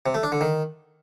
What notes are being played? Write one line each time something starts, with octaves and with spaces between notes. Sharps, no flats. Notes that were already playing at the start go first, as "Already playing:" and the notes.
C3
A3
D4
D3
D#3